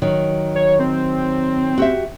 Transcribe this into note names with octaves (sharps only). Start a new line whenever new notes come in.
D#3 F#3
C#5
C4
F#4 G4 E5